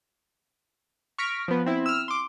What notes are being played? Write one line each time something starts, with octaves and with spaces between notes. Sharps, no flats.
C#6 F6 A#6 B6 D7
F3 B3
C4 E4
E6 F6
C6 D6